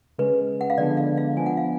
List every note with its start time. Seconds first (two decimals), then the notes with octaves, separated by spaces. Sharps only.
0.19 C#3 G#3 C#4 B4
0.61 F#5
0.70 F5
0.78 D3 F3 G#3 B3 D4 D5
0.97 F5
1.18 F5
1.37 F3 B3 D4 G#5
1.46 F#5
1.57 F5